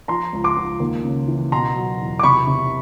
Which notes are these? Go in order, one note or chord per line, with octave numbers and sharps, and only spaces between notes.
F3 A#5 C6
C#2
C6 D6
C#2
D#2
C#3
E3
B2 A#5 C6
F#3
E2
D6
C3 B5 C#6
C3